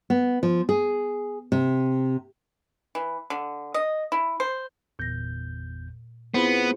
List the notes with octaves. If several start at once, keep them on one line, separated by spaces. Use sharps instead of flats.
B3
F3
G#4
C3
E3
D3
D#5
E4
C5
G1 E2 A#2 G6 A#6
B3 C4 E4 F4 G#4 C5 B5